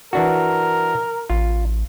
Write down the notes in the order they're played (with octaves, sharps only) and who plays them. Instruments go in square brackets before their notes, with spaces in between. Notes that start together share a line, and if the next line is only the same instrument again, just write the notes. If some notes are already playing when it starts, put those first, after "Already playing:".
[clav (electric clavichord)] E3 D4 F#4 [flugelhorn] A#4
[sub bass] A1 [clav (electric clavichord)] F4